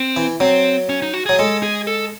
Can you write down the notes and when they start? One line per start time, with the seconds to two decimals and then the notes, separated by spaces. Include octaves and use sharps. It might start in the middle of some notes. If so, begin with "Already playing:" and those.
Already playing: C4
0.17 E3
0.40 F#3 C4
0.89 C#4
1.02 D#4
1.13 F#4
1.26 F#3 G#4
1.39 G#3 A4
1.63 G#4
1.87 A4